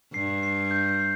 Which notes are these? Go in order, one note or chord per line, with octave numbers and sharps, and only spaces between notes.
G2 C7
C7
G6
C7